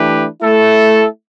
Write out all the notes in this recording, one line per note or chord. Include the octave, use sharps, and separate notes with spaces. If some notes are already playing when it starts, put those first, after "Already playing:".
Already playing: E3 A3 D4 G4 B4
A3 E4 A4